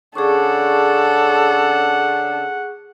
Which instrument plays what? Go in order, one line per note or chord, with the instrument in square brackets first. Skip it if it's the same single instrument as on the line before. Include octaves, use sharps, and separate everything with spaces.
[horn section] C#3 C#4 D4 [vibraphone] G#4 C#6 [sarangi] A4 [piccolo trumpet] F#5